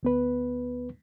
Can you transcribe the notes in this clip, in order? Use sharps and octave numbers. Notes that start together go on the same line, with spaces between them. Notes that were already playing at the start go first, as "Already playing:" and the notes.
D2 B3 B4